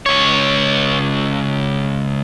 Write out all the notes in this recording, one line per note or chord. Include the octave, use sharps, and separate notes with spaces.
C#2 C#5